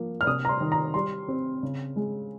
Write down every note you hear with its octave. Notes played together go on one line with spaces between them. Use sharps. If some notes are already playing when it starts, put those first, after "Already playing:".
Already playing: F3 A#3
F6
C3 D#6
A#5
C6
D#3
A#5
G3 C6
C4
C#3
G#3